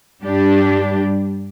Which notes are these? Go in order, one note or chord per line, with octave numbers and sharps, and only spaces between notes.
G2 G3 D4 G4